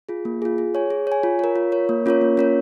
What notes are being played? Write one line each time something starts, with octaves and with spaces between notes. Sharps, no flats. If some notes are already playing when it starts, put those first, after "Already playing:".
F4 G#4
A#3
F4 G#4
G#4
C#5 G#5
G#4
C#5 G#5
F4
A#4 C#5
F4
A#4 C#5
A#3
C#4 F4 A#4 C#5
A#3
C#4 F4 A#4 C#5